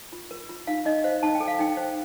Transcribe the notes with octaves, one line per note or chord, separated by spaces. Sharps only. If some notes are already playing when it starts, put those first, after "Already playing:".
F4
A#4
F4
D#4 F5
D#4 D#5
C5 F5
D#4 A5
G5
A4
F5
D#4 G5
C5